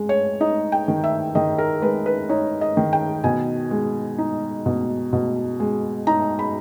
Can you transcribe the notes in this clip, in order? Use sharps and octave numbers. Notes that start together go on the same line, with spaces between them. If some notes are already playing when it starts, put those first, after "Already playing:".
Already playing: G#3
C#5
D#4 D#5
G5
D#3
E5
D#3 D#5
A#4
G#3 B4
B4
D#4 C#5
D#5
D#3
G5
B2 G#5
G#3
D#4
B2
B2
G#3
D#4 A#5
B5